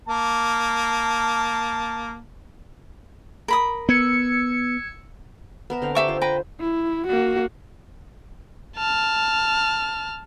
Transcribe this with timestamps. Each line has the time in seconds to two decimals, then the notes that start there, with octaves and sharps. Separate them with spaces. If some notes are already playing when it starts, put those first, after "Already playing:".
0.08 A#3 A5
3.48 A#4 B5 D#6
3.89 B3 E6 G#6 C#7
5.70 B3 A#4 E5
5.82 D3 C4 F5
5.95 G4 E5 C#6
6.08 F4 C5
6.21 B4 G5 A#5
6.60 E4
7.07 A#3 F#4
8.77 A5 F6